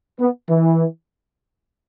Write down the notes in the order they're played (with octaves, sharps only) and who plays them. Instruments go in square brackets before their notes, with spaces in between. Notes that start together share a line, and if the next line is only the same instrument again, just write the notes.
[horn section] B3
E3